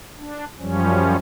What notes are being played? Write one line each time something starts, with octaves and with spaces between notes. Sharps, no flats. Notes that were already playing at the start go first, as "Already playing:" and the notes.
D4
F#2 F3 G3 C#4